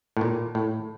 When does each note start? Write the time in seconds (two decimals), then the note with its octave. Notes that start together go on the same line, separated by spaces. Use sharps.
0.17 A2
0.21 A#2
0.55 A2